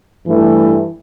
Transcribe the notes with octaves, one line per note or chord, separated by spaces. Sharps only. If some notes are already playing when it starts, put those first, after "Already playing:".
G2 E3 A3